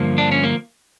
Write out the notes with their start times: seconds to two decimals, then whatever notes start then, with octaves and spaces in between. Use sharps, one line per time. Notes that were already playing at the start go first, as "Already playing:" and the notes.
Already playing: G2 D3 F3 A#3
0.18 D4
0.31 C#4
0.44 A#3